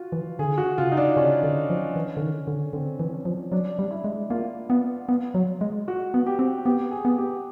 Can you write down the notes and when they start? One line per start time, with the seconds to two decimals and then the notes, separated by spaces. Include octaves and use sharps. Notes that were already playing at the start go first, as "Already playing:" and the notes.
Already playing: F4 F#4
0.12 E3
0.39 D3 G#4
0.58 F#4
0.78 C#3 F4
0.92 D#4
0.97 D4
1.17 C#3 C#4
1.43 D3
1.70 F3
1.96 E3
2.17 D3
2.22 D#3
2.47 D3
2.73 D3 C4
3.00 E3
3.14 C#4
3.25 F3
3.52 F#3 D4
3.79 G3
3.91 E4
4.04 G#3
4.30 A#3 F4
4.70 B3
5.09 B3
5.34 F#3
5.61 G#3
5.88 F#4
6.14 B3
6.26 G4
6.39 C4
6.66 B3 G4
6.91 G#4
7.05 B3
7.18 G4